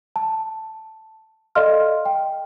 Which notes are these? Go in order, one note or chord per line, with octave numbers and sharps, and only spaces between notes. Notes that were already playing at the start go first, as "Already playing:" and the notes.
A5
A4 D5 D#5 F5 C6 F6
G5